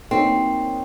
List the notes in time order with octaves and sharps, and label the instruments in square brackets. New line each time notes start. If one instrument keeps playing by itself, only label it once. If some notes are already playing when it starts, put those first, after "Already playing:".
[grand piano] A#3 D#4 F#4 A#4 C#5 [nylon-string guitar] C4